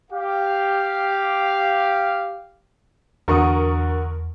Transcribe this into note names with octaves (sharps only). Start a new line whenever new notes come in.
G4 F5
E2 D3 F#4 A#4 C#6 D#6